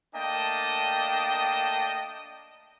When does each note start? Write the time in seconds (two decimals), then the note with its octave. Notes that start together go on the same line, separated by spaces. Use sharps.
0.15 A3 A#3 D4 D#5 G5 A5